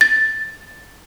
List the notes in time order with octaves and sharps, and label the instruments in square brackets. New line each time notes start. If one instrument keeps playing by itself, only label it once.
[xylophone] A6